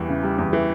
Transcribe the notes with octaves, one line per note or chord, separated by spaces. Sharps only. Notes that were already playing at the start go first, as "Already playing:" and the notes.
Already playing: E2 E3 G3
C#3
G3
E2
E3